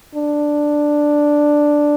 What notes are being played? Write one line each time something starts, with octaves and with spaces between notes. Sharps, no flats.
D4